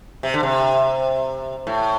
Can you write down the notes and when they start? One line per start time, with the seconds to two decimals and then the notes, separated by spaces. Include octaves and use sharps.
0.23 C3
0.34 D3
0.43 C3
1.67 A2